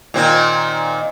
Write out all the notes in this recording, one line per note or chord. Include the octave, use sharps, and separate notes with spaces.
A#2 D#3 C4